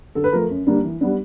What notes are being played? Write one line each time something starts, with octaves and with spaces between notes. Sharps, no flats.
D3 A4
B4
F3 A3 A#4
F#2
D3 G3 A#3 D4
E3
G3 B3 D4